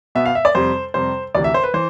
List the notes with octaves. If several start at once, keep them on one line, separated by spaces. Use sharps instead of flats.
B2 B3 E5
F5
E5
D5
F2 C3 G3 C5
F2 C3 G3 C5
D2 C3 E3 D5
E5
C5
B4
E3 C5